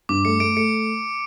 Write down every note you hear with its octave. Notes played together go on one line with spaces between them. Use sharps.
G2 D6
A3 C#7
A3 D7
A3 C#7